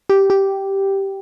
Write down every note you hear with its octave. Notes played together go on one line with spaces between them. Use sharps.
G4
G4